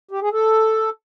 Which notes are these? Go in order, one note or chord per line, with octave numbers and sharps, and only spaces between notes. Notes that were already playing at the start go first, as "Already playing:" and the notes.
G4
G#4
A4